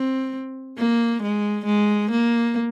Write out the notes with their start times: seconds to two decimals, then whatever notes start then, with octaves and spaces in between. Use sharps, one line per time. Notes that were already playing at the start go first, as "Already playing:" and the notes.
Already playing: C4
0.78 A#3
1.22 G#3
1.66 G#3
2.11 A#3